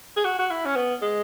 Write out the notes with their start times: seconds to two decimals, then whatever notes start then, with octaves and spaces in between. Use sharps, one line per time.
0.17 G#4
0.25 F#4
0.39 F#4
0.50 E4
0.65 C#4
0.76 B3
1.02 G#3